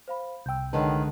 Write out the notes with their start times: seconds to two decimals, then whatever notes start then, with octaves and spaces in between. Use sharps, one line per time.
0.08 C5 F5 B5
0.46 C2 G5 E6 G6
0.73 D3 D#3 G#3 B4 C#5 D#5 A5